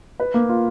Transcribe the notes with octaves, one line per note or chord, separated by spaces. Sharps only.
B4
A#3
F4